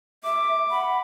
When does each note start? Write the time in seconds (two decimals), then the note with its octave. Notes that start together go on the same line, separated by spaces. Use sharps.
0.24 E5 D6
0.70 F#5 B5